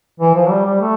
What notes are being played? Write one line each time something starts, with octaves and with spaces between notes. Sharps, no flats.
E3
F3
G3
G3
A3